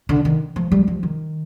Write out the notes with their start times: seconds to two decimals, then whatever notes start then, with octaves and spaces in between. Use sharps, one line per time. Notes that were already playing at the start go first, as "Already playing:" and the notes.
0.09 D3
0.25 D#3
0.56 F3
0.72 G3
0.88 F3
1.03 D#3